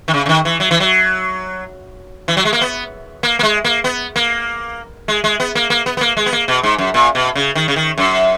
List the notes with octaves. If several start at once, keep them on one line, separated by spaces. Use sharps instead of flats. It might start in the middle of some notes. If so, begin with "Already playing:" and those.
D#3
C#3
C#3
D#3
E3
F#3
E3
F#3
E3
F#3
G#3
A#3
B3
A#3
A#3
G#3
A#3
B3
A#3
G#3
G#3
B3
A#3
A#3
B3
B3
A#3
G#3
B3
A#3
B2
G#2
F#2
A#2
B2
C#3
D#3
C#3
D#3
F#2